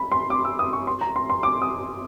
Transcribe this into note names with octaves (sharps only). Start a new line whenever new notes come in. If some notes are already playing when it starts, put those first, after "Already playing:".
Already playing: B5
C6
D6
E6
D#6
C#6
C6
A#5
C6
C6
D6
D#6